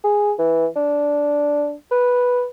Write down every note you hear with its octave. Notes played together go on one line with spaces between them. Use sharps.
G#4
E3
D4
B4